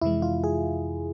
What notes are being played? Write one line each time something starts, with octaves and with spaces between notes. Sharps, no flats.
F2 C3 E3 G#3 E4
F4
G#4